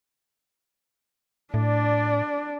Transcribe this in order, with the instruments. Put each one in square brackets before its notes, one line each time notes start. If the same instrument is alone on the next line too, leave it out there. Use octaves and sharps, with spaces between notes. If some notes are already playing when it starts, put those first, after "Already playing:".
[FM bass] A2 [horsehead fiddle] D4 D5